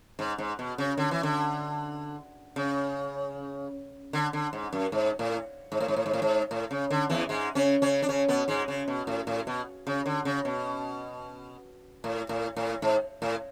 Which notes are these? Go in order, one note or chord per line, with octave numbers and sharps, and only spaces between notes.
G#2
G#2
B2
C#3
D3
E3
D3
C#3
D3
D3
G#2
F#2
G#2
A2
G#2
A2
G#2
A2
G#2
A2
G#2
A2
C#3
D3
E2 E3
G#2 G#3
C#3 C#4
C#3 C#4
D4
C#3 C#4
B2 B3
G#2 G#3
C#3
B2
A2
A2
B2
C#3
D3
C#3
B2
A2
A2
A2
G#2
A2